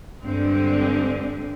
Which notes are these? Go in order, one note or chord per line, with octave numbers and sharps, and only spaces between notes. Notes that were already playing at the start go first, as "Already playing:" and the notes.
G2 D3 G#3 C4